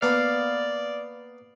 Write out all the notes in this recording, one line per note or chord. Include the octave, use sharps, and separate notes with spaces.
A#3 B3 D5 F5 A5